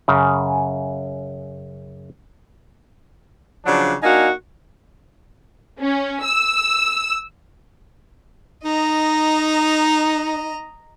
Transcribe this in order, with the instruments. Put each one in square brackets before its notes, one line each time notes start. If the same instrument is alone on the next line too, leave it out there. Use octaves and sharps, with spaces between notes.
[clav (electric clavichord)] F#2 C#3
[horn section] C#3 F3 F#3 D4
A#3 D4 D#4 F#4 F5 G#5
[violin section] C#4
E6
[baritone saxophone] D#4 [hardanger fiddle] D#5 A#5